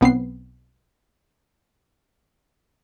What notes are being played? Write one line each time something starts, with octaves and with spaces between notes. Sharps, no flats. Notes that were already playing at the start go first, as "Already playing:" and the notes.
B1 B3 C4 C7